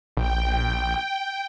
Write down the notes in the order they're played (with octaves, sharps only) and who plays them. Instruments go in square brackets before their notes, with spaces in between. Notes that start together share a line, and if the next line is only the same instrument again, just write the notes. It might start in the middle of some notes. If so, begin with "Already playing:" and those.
[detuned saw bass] A#1 [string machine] G5